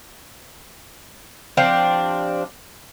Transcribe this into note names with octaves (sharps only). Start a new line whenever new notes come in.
F3 C4 D4 G4